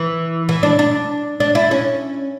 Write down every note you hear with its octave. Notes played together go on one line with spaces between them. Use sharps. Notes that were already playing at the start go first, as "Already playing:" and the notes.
Already playing: E3
E3
D4
D4
D4
E4
C#4